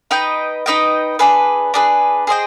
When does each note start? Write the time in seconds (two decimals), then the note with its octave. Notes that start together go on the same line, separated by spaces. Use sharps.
0.11 D#4 B4 D#5 G5
0.66 D#4 B4 D#5 G5
1.19 D4 G#4 B4
1.74 D4 G#4 B4
2.27 G#4 C5 D#5 G5